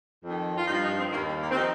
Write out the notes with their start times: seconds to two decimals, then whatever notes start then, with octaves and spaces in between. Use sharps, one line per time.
0.24 F2 D#3
0.57 F4
0.67 G2 F3 D#4
0.82 D#4
0.97 C4
1.11 D#2 D#3 A#3
1.27 G3
1.41 A#3
1.51 C4
1.55 F3 D#4